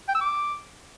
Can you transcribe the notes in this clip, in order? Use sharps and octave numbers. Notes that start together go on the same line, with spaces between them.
G5
E6
D6